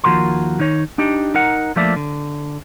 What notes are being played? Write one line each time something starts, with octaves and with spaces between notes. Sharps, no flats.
D#2 E3 F3 F#4 A#4 C6
D#3 D#4 C#5
D4 D#4 G4
D#4 A#4 F#5
F3 A3 A#3 D4 D5 E5
D3